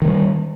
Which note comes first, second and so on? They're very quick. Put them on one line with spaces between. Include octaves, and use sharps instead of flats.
D#3 G#3 G3